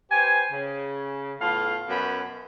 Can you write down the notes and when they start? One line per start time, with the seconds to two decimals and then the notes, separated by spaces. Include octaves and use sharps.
0.11 G4 B4 C5 G#5
0.51 C#3
1.41 A2 B3 F4 F5 A5
1.89 F#2 B2 B3 C#4 B5